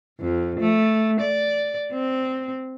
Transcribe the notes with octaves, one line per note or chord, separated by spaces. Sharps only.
F2
A3
D5
C4